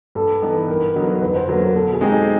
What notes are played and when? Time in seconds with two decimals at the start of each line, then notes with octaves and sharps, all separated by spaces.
0.15 G2 A4
0.42 E3 G3 B3 D#4
0.68 G2 A#4
0.95 D3 F#3 B3 D#4
1.21 F2 B4
1.36 C5
1.48 D3 F#3 A#3 B4
1.61 A#4
1.75 B2 A4
1.93 G#4
2.01 G#3 C4 D#4 G4
2.10 A4